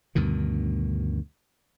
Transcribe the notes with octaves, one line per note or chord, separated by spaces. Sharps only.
D2 G2 B2 D#3